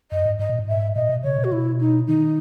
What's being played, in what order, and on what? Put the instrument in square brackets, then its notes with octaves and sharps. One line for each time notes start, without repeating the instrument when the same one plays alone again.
[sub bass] F#2 [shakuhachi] D#5
[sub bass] G#2
[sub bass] G#2 [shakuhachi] D#5
[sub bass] A#2
G#2
[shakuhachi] E5
[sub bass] A#2 [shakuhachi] D#5
[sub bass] B2
[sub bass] C#3 [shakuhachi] C#5
[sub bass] B2
[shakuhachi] F#4
[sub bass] B2 [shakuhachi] E4
[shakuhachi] D#4
[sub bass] D#3 [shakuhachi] D#4